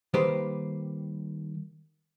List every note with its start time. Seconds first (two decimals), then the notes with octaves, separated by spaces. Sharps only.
0.14 D#3 G3 A#3 G4 B4 C5